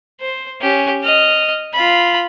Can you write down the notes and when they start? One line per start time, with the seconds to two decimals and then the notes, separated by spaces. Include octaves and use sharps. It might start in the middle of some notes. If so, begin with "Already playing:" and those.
0.20 C5
0.61 C#4 G4
1.03 D#5 F6
1.73 F4 B5